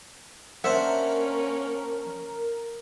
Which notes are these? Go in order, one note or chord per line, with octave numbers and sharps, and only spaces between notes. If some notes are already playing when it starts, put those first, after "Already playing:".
A#3 C#4 D4 A#4 C5 E5 F#5